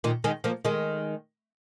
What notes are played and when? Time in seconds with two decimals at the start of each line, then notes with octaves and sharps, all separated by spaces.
0.04 A#2 D#3
0.24 D#3 G#3
0.44 F3 A#3
0.65 D#3 G#3